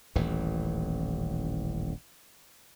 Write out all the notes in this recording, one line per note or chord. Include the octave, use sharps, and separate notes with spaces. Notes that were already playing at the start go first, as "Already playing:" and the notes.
D#1 A1 D#2 E3